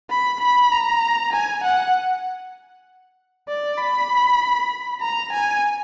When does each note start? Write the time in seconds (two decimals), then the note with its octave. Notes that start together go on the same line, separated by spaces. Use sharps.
0.10 B5
0.41 B5
0.71 A#5
1.33 G#5
1.64 F#5
3.49 D5
3.78 B5
5.01 A#5
5.33 G#5